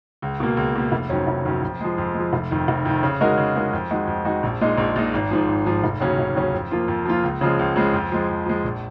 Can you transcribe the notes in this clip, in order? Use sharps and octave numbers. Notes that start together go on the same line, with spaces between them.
C#2
B2 A#3
C#2
B2 A#3
F1
F2 D#3 F#3 C#4
F1
F2 D#3 F#3 C#4
F2
F3 G#3
F2
F3 G#3
F1
F2 D#3
F1
F2 D#3
C#3
G#3 D#4 F#4 A#4
C#3
G#3 D#4 F#4 A#4
F2
D#3 G#3 D#4 F#4
F2
D#3 G#3 D#4 F#4
A#1
A#2 G#3 D#4
A#1
A#2 G#3 D#4
G#1
G#2 F3
G#1
G#2 F3
F1
D#2 C#3 F#3 C#4
F1
D#2 C#3 F#3 C#4
F2
F3 A#3 F4
F2
F3 A#3 F4
C#2
C#3 F3 G#3
C#2
C#3 F3 G#3
F2
F3 G#3
F2
F3 G#3
A#1